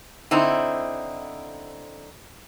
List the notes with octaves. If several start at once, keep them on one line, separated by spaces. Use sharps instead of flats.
D3 C4 D#4 E4